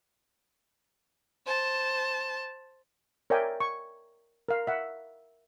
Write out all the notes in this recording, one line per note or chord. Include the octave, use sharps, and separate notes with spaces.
C5 A5
A#4 C#5 D5 E5 G5 G#5
C#6
A#4 F5
E5 F#5